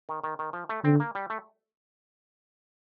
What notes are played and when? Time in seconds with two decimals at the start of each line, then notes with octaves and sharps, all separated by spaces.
0.09 D#3
0.24 D#3
0.39 D#3
0.53 F3
0.69 A3
0.84 D3 C4
1.00 A#3
1.15 G3
1.30 A3